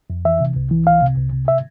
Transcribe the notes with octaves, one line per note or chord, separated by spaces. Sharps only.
F2
E3 E5
C3
C2
E3
C2 F5
C3
C2
C3
E5